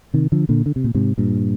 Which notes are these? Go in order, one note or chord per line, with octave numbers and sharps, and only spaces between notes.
C3 D#3
D3 F3
A#2 D3
D3
C3
A#2
G#2 C3
G2 A#2